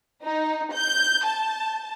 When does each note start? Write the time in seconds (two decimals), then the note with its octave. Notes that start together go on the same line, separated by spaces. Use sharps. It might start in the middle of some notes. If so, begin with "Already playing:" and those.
0.23 D#4
0.73 G6
1.25 A5